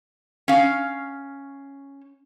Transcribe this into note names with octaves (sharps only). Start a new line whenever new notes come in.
C#4 F5